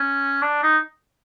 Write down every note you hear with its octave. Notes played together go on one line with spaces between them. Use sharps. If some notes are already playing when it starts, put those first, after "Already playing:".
Already playing: C#4
D4
D#4